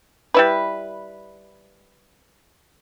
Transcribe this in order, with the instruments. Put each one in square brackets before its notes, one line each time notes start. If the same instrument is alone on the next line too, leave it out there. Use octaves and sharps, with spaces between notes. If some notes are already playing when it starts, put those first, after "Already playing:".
[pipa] G3 E4 B4